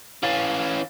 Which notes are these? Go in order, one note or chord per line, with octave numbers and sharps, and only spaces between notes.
E3 C#4 F5 A6